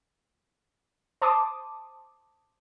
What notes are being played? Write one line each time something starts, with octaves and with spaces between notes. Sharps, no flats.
C5 A5 C6 D6 D#6